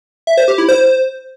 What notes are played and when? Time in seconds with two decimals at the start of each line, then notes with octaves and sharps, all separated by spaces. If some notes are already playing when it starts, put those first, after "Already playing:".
0.27 E5
0.37 C5
0.48 G4
0.58 E4
0.69 C5